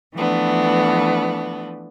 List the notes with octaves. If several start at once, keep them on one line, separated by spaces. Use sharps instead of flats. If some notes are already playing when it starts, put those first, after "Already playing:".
E3 F3 A3 B3 D4